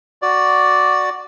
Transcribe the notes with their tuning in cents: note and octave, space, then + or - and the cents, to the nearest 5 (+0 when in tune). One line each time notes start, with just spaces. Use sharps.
F#4 +0 D5 +0